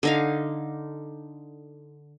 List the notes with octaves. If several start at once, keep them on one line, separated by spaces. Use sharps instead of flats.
D3 D#4 F5